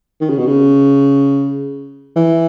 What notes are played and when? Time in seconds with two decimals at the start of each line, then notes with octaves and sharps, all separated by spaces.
0.21 D#3
0.30 C#3
0.38 B2
0.46 C#3
2.16 E3